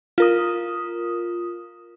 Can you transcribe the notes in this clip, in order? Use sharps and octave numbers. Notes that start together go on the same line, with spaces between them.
F4 A#4 D#6